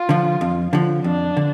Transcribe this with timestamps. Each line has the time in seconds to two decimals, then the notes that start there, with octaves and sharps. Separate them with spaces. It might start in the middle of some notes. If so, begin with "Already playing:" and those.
Already playing: F4
0.09 D3 F3
0.41 F2
0.73 D3 F3
1.04 F2 D4
1.37 D3